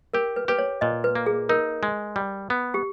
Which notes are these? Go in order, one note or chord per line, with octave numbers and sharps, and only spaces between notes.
G4 A#4
B4
G4 B4
C#5
A#2 D#5
B4
A#3
G#4
D#4 A#4
G#3
G3
B3
G4